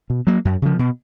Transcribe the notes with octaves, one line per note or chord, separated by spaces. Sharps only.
B2
F#3 A#3
F#2
C#3 F3
B2